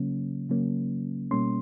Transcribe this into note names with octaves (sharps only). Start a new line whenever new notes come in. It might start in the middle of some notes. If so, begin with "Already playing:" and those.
Already playing: C#3 F#3 A#3 C#4
C#3 F#3 A#3 C#4
B2 G3 A#3 C#4 C6